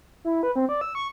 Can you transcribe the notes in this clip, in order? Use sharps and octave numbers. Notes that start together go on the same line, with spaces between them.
E4
B4
C4
D5
E6
C#6